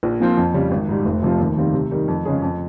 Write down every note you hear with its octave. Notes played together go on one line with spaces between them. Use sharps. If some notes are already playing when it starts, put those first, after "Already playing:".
A#1
A#2 F3 C4
F2
C#3 G3
G#1
G#2 G3
F1
F2 C3 F3
D#2
D#3 G3 C4 F4
C3
D#3 G3
F2
C#3 G#3 C#4 G#4
F2